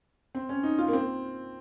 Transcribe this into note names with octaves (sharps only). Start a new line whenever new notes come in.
C4
C#4
D#4
F4
A#3
C4